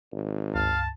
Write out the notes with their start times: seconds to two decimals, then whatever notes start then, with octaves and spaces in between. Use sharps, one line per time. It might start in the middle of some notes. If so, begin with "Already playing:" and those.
0.12 G#1
0.55 C#2 G2 F5 A5